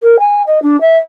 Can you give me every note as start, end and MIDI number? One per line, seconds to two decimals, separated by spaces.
0.03 0.17 70
0.20 0.42 80
0.47 0.62 75
0.62 0.79 62
0.81 0.97 76